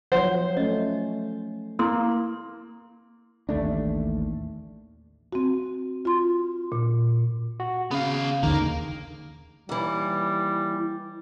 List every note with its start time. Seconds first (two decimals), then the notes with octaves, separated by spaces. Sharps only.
0.12 F3 F#3 C5 C#5 F#5
0.57 A3 C#4 D#5
1.79 A#3 E4 A#4 C6
3.49 A1 D#2 A3 D4
5.33 C4 F#4
6.05 F4 C6
6.72 A#2
7.60 F#4
7.91 C#3 B3 F5
8.43 D#2 D3 D#3 A#3
9.69 D#2 E3 G3